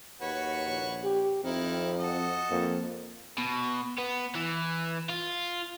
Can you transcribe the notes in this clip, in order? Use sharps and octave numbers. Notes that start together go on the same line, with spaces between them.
D#2 F#4 B4 C#5
A#1
G4
F2 D#3 C4 E4
F#4 A4 D#5
F2 A#3
B2
B3
E3
F4